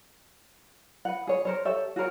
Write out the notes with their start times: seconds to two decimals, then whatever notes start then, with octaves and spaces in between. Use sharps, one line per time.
1.05 B4 F#5
1.27 G#4 C#5
1.45 A#4 C5 C#5
1.65 G4 A4 C#5 E5
1.96 F#4 G#4 A#4 C#5